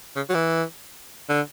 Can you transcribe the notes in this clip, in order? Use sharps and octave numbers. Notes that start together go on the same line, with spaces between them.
C#3
F#3
E3
D3